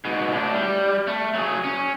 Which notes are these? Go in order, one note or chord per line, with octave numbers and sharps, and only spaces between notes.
G#2 B2
A2 D4
G3
A3
F#3 G#4
C#4